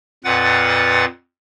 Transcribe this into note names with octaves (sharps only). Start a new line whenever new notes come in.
F2 A#2 B4 F#5 A6